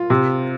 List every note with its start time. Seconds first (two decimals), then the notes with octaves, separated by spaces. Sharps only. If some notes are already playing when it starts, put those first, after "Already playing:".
Already playing: F4
0.10 C3